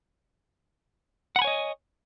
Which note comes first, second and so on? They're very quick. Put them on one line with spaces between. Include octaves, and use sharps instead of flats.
F#5 B5 G#5 C#5 D#5